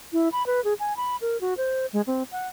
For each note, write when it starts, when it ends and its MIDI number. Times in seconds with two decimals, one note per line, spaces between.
0.13 0.29 64
0.32 0.45 83
0.46 0.63 71
0.64 0.74 68
0.80 0.96 80
0.97 1.16 83
1.21 1.39 70
1.41 1.54 66
1.57 1.86 72
1.93 2.01 56
2.07 2.23 60
2.32 2.48 78